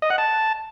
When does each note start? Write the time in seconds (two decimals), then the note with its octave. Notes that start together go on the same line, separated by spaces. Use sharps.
0.02 D#5
0.10 F#5
0.18 A5